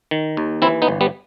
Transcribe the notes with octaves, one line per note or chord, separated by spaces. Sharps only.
D#3
D#2
E3 C4 E4
B3 D#4
G1
G3 B3